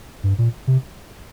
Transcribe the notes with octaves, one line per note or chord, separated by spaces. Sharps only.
G2
A#2
C3